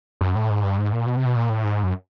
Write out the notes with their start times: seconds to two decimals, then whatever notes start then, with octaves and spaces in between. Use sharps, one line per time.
0.21 F#2
0.35 A2
0.50 G#2
0.64 G2
0.78 G#2
0.93 A#2
1.06 B2
1.17 C3
1.26 B2
1.36 A#2
1.50 A2
1.64 G#2
1.83 F#2